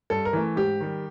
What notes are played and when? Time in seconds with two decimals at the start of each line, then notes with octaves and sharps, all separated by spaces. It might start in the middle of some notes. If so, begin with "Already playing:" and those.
0.10 G2 A4
0.25 A#4
0.33 E3 A3
0.56 G#2 G4
0.80 D#3 G3